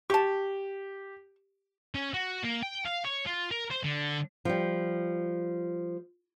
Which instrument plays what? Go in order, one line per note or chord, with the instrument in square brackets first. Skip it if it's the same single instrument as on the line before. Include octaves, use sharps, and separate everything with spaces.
[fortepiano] G4 [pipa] A5 C#6
[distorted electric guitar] C#4
F#4
A#3
G5
F5
C#5
F4
A#4
C5
D3
[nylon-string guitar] F3 G3